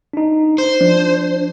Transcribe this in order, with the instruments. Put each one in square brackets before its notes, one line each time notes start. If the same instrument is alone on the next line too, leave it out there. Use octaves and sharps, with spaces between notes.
[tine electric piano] D4 D#4
[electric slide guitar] C5
[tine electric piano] F3 [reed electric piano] D4